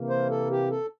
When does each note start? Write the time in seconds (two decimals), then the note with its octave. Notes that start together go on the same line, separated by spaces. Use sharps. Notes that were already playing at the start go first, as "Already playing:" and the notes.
Already playing: C3 E3 A#3
0.09 C5
0.30 A4
0.50 G4
0.70 A4